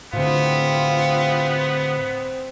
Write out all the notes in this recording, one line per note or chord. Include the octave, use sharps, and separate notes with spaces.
A2 D3 B3 C4 F4